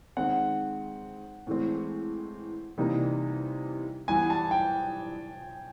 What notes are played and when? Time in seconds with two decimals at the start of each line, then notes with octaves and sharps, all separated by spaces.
0.17 D#3 G#3 C4 F#5
1.47 A2 E3 G#3 C4
2.78 C3 E3 G3 A#3 D#4
4.08 G2 E3 G3 B3 G#5
4.30 A5
4.51 G5